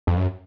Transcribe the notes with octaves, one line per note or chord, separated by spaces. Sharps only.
F2
F#2